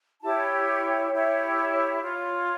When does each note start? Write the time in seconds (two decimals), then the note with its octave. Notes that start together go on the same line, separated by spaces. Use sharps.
0.21 E4 G4 C#5 A5
1.11 E4 G4 C#5
2.01 F4 C#5